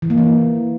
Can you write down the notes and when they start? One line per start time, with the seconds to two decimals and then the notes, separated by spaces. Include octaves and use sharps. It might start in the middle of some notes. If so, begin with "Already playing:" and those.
0.02 E3
0.10 A#3
0.18 E3